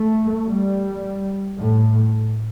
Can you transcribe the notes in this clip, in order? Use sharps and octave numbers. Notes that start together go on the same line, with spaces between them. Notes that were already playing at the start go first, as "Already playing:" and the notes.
Already playing: A3
G3
A2